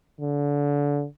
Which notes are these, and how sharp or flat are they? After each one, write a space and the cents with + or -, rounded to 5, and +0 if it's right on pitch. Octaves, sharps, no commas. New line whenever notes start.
D3 -25